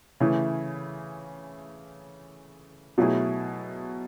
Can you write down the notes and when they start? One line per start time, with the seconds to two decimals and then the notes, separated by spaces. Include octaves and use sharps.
0.20 C#3 E3 A3 E4
2.98 B2 F#3 A3 E4 G#4